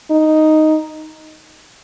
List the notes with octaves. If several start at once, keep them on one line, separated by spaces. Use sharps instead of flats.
D#4